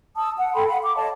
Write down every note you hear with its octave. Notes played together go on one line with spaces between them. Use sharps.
A5 D#6 E6
F#5
A4 G5 B5 C6
F5 F#5 B5
D6
C#5 D#5 F5 A5